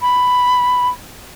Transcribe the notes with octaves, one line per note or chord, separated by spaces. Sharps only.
B5